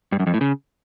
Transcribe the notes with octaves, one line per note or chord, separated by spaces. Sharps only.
G2
F#2
F2
A2
C#3